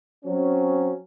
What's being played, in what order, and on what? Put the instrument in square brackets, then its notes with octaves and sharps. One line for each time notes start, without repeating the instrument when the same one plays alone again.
[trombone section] F#3 C4 C#4